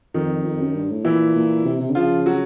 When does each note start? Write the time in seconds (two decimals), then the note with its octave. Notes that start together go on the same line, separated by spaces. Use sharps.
0.14 F2 D#3 D#4
0.45 F2
0.60 F#2
0.75 G2
0.90 A2
1.05 A#2 E3 E4
1.36 A#2
1.65 C3
1.81 C3
1.90 D3
1.95 C#3 F3 F4
2.26 F#3 F#4